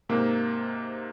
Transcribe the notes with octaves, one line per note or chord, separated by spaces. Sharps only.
G#2 C3 A#3